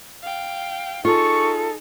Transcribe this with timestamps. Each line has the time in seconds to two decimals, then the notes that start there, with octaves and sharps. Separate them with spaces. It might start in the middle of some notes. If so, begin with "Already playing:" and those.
0.22 F5 G5
1.05 D#4 F4 G#4 A4 C#6